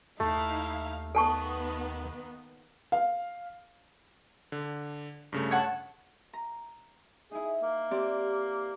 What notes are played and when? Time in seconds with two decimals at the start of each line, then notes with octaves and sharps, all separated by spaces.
0.20 D#2 A3 D#4 E4 F5
1.15 D#3 A#3 B3 A4 A5 C#6
2.92 F5
4.52 D3
5.33 G2 C#3 A3
5.51 C#5 F#5 A5
6.33 A#5
7.31 D#4 E4 G#4
7.62 A#3
7.91 C4 G4 D5